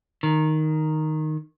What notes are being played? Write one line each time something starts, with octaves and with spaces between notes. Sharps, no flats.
D#3